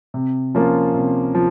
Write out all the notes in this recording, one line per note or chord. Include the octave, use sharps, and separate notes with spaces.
C3
F3 A#3 C#4 F4
C3
F3